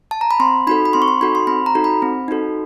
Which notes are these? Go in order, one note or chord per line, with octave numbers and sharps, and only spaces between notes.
A5
A#5
B5
C4 C6
D#4 F#4 A4 B5
B5
C4 C6
C#6
C6
D#4 F#4 A4 B5
C6
C4 B5
A#5
D#4 F#4 A4
B5
C4
D#4 F#4 A4